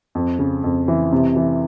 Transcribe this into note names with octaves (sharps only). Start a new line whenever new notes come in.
F2
C#3
F2
E3
C3
E3